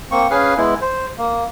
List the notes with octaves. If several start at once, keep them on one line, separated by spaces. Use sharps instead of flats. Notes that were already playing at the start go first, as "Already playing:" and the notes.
A#3 C4 C#6
C#4 G#4 B4 F5
G#3 B3 E4
C5
A#3